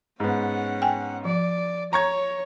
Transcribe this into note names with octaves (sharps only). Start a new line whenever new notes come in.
G#2 B3 C#4 F#5
G5 G#5
F3 D5
C#5 A#5 C#6 G#6